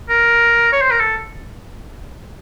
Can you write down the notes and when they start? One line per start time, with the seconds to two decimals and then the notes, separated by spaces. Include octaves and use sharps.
0.09 A#4
0.73 C#5
0.81 C5
0.91 A#4
1.00 A4